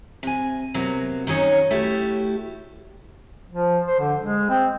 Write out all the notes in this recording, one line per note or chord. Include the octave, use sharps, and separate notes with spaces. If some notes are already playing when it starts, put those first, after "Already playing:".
C3 G#5
C3 F#3 A#3 B3
D#3 F#3 C#4 D#4 C#5
A3 E4 F#4 G4
F3
C5
D3
G#3
C4